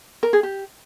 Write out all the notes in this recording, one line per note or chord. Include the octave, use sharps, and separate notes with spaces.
A#4
G#4
G4